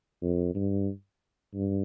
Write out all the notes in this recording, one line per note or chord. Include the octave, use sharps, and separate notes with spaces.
F2
G2
G2